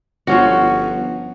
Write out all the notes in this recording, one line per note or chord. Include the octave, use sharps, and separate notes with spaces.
G1 F3 C#4 F#4